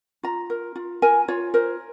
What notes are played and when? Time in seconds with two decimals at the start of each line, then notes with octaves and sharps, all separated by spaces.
0.23 F4 A#5
0.50 A#4
0.76 F4
1.02 A#4 G#5
1.28 F4 C#5
1.54 A#4 C5